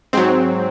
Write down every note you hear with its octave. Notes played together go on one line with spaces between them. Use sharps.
G#2 F#3 C4